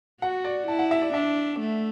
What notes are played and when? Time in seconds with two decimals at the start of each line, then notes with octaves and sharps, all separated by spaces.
0.22 F#4 F#5
0.44 D5
0.67 E4 A5
0.79 F#5
0.91 E5
1.02 D5
1.14 D4 E5
1.60 A3